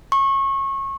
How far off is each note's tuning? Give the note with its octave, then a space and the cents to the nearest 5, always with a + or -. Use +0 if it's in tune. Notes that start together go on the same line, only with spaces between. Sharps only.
C#6 -25